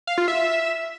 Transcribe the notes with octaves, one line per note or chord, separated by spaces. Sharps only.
F5
F4
E5